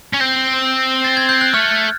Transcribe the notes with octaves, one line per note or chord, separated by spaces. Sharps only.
C#4
C4 G6
A6
G#6
G6
F#6
A3 F6